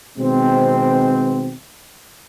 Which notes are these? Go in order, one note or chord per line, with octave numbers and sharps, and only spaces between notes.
B2 D#3 G#3 B3 C4